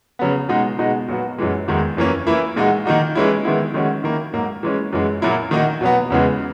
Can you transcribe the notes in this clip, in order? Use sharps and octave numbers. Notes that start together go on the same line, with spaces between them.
C#3 F#3 B3
B2 G#3 D#4 F#4
B2 G#3 D#4 F#4
A#2 F#3 B3 F#4
F#2 E3 G#3
E2 D#3 G#3 D#4 F#4
F#2 E3 A#3 C#4
E3 A#3 E4
A#2 G#3 D#4 F#4
D#3 A#3 D#4 F#4
E3 G#3 C#4 E4
D#3 G#3 B3 E4
D#3 G#3 C#4 F#4
D#3 A#3 E4
G#2 F#3 A#3
E3 G#3 C#4
F#2 E3 G#3
A#2 F#3 A#3 E4
D#3 A#3 D#4 F#4
B2 F#3 B3
E2 C#3 E3 G#3 B3